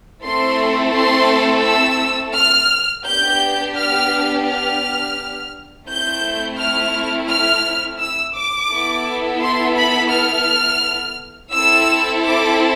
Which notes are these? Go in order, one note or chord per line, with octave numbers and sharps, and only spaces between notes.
A3 C4 E4 A4 C6
C6
E6
F6
B3 D4 G4 G6
F6
F6
A3 C4 E4 G6
F6
F6
E6
D6
B3 E4 A4
C6
B5
F6
C4 E4 A4 E6
D6